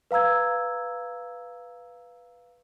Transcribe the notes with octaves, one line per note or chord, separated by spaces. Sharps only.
B4 F5 A#5 E6 G#6